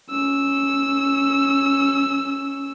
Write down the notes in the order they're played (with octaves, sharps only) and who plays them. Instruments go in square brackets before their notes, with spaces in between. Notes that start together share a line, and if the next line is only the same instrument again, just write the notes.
[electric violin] C#4 E6